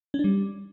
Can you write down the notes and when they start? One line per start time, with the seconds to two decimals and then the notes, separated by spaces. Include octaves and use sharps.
0.14 C#4
0.19 D4
0.24 G3